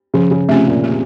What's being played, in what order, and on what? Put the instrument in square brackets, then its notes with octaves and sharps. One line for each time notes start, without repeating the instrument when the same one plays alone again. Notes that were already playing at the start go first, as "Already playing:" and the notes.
[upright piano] C#3 [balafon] F3
[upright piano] C#3
[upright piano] C3 [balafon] A3
[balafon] C#4 F4
[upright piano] A#2
[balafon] A#3